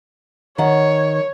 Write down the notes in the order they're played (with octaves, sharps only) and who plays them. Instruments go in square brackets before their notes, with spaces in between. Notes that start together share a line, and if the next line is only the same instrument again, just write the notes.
[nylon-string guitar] D#3 F#5 [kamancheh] C#5